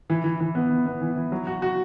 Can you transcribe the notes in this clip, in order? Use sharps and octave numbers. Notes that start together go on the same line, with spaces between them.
E3
E3
E3
B3
E3
B3
E3
E3
F#3
F#4
F#4